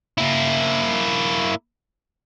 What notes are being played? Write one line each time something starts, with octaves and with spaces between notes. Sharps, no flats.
A#3 E4